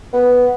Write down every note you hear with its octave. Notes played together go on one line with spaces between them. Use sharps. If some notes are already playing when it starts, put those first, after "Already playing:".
B3